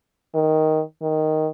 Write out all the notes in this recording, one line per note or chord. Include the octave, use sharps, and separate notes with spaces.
D#3
D#3